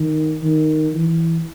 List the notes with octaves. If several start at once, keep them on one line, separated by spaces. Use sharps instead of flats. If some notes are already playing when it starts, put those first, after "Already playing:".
Already playing: D#3
D#3
E3